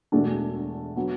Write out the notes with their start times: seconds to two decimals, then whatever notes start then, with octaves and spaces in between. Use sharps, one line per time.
0.12 E1 E2 B2 A3 D4
0.96 F#3 B3 D4